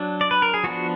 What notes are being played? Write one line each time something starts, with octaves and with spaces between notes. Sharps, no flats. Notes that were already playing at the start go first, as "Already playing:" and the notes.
Already playing: F#3 D4
D5
B4
A#4
G#4
F3 B3 D4 F#4